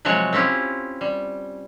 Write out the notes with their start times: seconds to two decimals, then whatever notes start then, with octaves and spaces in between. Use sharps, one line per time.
0.05 C3 F3 F#3 G#3 C#5 F#5
0.33 C4 C#4 E4 F4 G4
1.01 G3